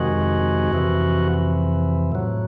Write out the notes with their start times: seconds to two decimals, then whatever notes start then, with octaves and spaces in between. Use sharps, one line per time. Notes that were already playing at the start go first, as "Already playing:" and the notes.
Already playing: F2 C3 D#3 G#3 F#4
0.73 F2 C3 E3
2.12 A2 F#3